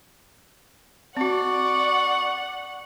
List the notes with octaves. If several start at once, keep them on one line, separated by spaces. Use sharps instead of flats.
C4 F#4 D5 F#5 C#6